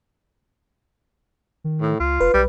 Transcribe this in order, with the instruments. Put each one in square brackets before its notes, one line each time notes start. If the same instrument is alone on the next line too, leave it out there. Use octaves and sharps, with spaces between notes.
[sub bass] D#3
[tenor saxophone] A2
[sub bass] C#2 [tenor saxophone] F4
[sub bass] F1 [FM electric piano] B4
[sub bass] B1 [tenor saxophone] G3